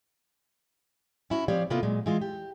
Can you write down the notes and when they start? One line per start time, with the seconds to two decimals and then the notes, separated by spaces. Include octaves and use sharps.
1.30 C#4 E4 F#4
1.48 F3 C4 G4 C#5 D5 F5
1.70 C3 A#3 B3 E4 F4 A4
1.83 A#2 F#3 G#3
2.06 E3 G#3 F4
2.21 G4